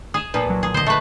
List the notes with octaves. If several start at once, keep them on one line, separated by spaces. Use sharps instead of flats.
G#4 D#6 D#7 E7
A#2 F3 B4
C2 F#3
G#4
D3 C5 D#5
A3 B4